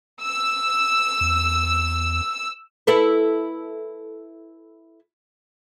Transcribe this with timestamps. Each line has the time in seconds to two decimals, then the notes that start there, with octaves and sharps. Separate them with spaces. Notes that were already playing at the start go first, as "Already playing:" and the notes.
0.22 E6
1.21 E2
2.87 E4 A4 B4